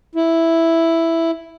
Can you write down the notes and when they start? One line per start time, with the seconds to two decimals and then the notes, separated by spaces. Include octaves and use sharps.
0.15 E4